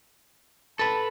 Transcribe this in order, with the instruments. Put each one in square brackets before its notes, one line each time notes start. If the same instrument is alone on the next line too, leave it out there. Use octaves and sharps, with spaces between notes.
[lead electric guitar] A4 B4 [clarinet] A5